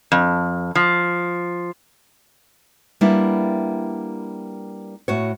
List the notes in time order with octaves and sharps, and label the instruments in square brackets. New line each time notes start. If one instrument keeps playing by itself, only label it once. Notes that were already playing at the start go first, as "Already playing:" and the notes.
[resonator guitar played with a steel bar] F2
F3
[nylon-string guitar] G3 A#3 B3 D4 E4
A2 F#4 C#5